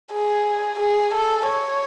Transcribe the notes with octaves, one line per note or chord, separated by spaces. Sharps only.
G#4
G#4
A4
C#5